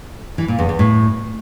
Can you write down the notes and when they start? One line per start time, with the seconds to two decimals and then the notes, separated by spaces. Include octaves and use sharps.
0.38 E3
0.48 A#2
0.59 E2
0.69 E2
0.79 A2